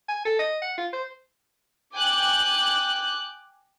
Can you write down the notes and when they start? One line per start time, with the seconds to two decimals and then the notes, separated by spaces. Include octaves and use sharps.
0.09 G#5
0.25 A4
0.39 D#5
0.62 F#5
0.78 F4
0.93 C5
1.96 G5 G#5 D6 F#6 G6